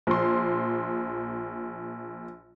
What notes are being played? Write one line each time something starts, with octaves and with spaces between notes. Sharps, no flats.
A#1 C6